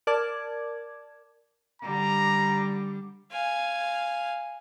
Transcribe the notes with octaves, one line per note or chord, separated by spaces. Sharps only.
A#4 D5 A5 D6 G#6
D3 G3 A#5
F5 G#5